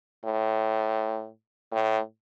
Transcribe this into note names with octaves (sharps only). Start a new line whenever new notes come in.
A2
A2